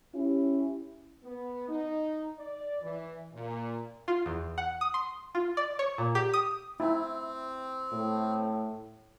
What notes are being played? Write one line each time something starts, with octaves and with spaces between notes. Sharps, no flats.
C#4 E4 G4
B3
D#4
D5
E3
A#2
F4
E2
F#5
D#6
C6
F4
D5
C#5
A#2
G4
D#6
C4 E4
A2